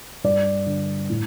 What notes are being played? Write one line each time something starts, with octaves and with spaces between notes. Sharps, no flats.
G2 D5
D3
A2